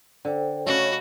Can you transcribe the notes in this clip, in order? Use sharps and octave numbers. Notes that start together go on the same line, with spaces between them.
D3 A4 C5 G5
C#3 A3 F#4 C#5 D#5 B5